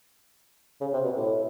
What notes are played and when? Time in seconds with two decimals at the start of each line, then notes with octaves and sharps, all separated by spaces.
0.81 C#3
0.93 C3
1.04 B2
1.16 A2